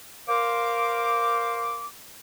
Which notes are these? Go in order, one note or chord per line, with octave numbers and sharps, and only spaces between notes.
A#4 C5 F5 C6 D6